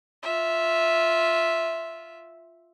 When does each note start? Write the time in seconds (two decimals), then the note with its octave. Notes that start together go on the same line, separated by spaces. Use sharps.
0.23 F4 E5